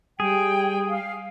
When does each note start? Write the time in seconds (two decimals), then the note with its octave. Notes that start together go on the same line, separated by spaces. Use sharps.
0.20 G3 G#4 G5
0.89 F5